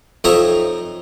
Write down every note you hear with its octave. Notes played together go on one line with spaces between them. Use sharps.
F2 D#4 C#5 E5 A#5